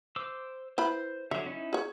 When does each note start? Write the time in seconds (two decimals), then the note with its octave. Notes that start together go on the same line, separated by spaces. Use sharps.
0.16 C5 D6 E6
0.78 E4 B4 C5 B5
1.31 D3 F#3 E5
1.46 C#4 D#4 E4
1.73 G#4 C#5